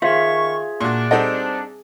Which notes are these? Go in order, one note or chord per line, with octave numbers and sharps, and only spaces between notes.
D#3 F4 G#4 C5 E5 F5 C#6
A#2 D4 F#4
G3 C4 D#4 A4 D#5 F#5